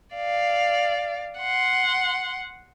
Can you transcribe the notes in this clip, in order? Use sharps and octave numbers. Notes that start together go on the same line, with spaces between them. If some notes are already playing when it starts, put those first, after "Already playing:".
D5 F5
F#5 C6